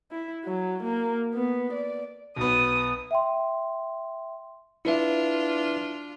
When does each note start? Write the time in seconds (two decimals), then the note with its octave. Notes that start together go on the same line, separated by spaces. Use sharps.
0.11 E4
0.45 F#3
0.83 A#3
1.34 B3
1.73 D5
2.36 B1 B3 D#6
3.11 E5 G5 C6
4.85 D4 E4 F4 B4 E5